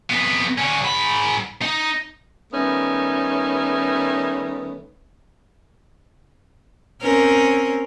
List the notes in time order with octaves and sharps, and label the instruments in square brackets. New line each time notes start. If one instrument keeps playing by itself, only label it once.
[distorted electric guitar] F2 B3
D3 C#4
G#2 B5
D#4
[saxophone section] D#3 G3 A3 B3 C#4 D#4
[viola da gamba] C4 C#4 A#4